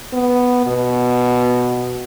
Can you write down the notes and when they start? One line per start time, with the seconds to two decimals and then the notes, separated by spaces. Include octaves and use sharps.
0.13 B3
0.66 B2